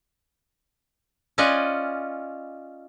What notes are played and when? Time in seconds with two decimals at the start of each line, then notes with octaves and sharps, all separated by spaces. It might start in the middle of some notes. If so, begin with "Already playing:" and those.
1.38 C#4 F4 D5 D#5 F#5 G#5